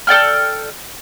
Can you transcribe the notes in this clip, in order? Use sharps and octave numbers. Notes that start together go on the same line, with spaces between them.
A4 D5 G5 F6